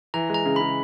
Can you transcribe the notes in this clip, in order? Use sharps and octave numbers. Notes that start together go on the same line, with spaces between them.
E3 A#5
G#3 A#5
C#3
C#3 B5